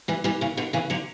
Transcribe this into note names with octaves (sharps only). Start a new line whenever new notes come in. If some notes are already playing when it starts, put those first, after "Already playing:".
E3 G3
E3 G3
C#3 E3
B2 D3
C#3 E3
D3 F#3